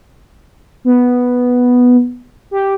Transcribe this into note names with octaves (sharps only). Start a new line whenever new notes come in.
B3
G4